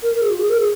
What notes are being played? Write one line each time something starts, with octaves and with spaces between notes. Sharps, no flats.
A#4
A#4
G#4
F4
G#4
A#4
G#4